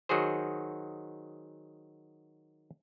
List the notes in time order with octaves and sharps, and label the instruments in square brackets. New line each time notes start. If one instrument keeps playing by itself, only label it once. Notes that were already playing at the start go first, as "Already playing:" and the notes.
[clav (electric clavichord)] D#3 F#3 F#4 G#4 C5